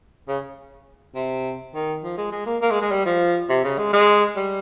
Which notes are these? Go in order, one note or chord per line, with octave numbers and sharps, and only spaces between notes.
C#3
C3
D#3
F3
G#3
G#3
A#3
A#3
G#3
G#3
G3
F3
C3
C#3
G#3
G#3
G3